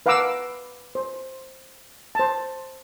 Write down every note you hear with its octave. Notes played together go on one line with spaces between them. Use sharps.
B4 F5 F#5 A#5 D6 E6
C5
C5 A5